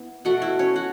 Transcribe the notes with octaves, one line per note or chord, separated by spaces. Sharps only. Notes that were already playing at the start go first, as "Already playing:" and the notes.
Already playing: B3 E4
B2 A3 F#4 F#5
E4 E5
C#4 C#5
F#4 F#5